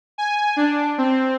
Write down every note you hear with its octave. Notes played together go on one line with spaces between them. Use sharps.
G#5
D4
C4